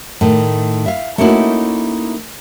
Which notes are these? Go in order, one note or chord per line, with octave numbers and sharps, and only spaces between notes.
A2 D#3 A3
E5 F5
A3 A#3 C#4 D#4 E4 F#4